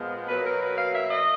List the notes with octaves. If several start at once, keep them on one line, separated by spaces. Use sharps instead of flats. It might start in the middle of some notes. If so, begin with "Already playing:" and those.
Already playing: A#2 F3 G#3 B3
B2 F#3 A#3 B4
A#4
B4
F5
E5
D#5